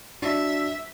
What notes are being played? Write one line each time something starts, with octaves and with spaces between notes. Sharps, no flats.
D4 F#4 E5